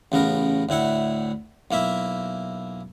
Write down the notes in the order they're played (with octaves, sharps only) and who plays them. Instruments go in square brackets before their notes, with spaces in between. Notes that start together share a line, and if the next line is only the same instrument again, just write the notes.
[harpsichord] A1 C#3 B3 A#4
D2 A2 E4 F#5
B1 A#3 E4 E5